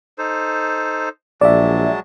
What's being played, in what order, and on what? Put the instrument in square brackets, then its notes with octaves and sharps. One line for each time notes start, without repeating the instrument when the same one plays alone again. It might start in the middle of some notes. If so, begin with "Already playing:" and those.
[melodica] D#4 A4 C5
[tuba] A#1 [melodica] F#3 G#3 A5 [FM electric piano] D5 E5